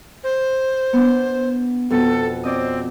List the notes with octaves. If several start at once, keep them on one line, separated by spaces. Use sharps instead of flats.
C5
B3 D4
F2 B2 A4
C4 D5 D#5 D#6